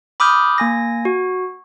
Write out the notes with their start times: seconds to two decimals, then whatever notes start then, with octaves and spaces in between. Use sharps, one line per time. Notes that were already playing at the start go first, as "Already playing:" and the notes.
0.20 B5 D6 D#6 F6 G6
0.58 A#3 G#5 A#6
1.05 F#4